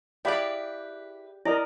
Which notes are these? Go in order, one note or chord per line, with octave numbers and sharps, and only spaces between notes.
E4 G4 G#4 B4 D5 F5 B5 D6
E4 A#4 D5 D#5 A#5